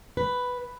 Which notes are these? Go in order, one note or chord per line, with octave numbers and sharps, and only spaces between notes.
B4